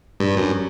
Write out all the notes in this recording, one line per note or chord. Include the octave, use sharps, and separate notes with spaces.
G2
F#2